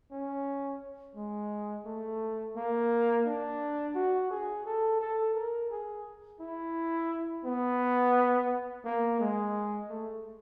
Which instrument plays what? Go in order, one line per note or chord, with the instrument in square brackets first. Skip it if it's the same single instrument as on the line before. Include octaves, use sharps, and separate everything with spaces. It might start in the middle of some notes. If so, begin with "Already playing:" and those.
[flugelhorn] C#4
G#3
A3
A#3
D4
F#4
G#4
A4
A4
A#4
G#4
E4
B3
A#3
G#3
A3